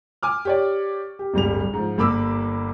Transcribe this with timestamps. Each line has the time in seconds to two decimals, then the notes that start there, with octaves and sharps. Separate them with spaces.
0.23 G#5 D6 F6
0.45 G4 C#5 D5
1.19 G4
1.34 D1 G1 G3 F7
1.73 G#2 F3
1.98 G1 A#3 B5 D6 E6